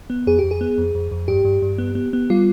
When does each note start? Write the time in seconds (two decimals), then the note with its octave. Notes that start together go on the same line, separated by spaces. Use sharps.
0.10 B3
0.27 F2 G#4
0.39 F2 G4
0.51 G#4
0.61 B3
0.78 F2
0.95 F2
1.11 F2
1.28 G2 G4
1.45 G2
1.62 G2
1.78 B3
1.95 B3
2.13 B3
2.30 G3 F4